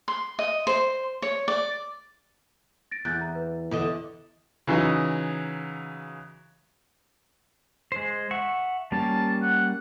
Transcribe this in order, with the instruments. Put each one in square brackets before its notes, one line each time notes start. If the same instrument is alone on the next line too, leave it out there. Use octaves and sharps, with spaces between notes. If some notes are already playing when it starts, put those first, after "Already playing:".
[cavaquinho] C6
D#5
C5
C#5
D5
[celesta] A6 A#6 D7
[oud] E2 [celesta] F#6 G6 A6
[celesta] A#5
B4
[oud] E2 D3 D#5
[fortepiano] C#3 E3 F#3 D#4
[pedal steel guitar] G#3 C5
E5 F#5 C#6
[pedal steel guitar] G3 A#3 C#4 [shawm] A5
[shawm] F#5